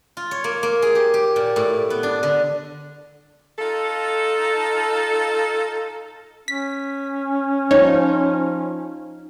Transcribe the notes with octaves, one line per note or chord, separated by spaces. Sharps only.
F4
C#5
A#3
A#3
G#4
G4
G4
A#2
A2
B3
D4
D3
D#4 F4 A4
C#4 B6
F3 D#4 C#5